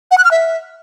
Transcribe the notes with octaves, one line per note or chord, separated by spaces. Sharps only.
F#5
F#6
F6
E5